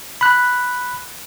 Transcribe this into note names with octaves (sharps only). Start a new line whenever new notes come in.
B5 F#6